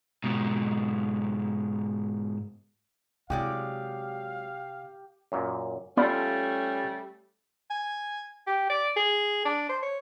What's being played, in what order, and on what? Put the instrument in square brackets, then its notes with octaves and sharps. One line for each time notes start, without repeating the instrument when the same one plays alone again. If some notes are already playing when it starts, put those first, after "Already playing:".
[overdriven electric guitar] G#2 B2
[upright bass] C3 [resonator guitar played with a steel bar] F#3 G#3 D5 [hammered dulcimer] G4 [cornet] F5
[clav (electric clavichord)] F#2 A#2
[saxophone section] G3 A3 C#4 [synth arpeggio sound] B3 D5 B5 [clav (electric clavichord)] F4 A4
[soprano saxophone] G#5
G4
D5
G#4
D4
C5
C#5